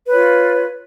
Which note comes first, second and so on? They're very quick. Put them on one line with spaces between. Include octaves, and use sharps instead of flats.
B4 C#5 F4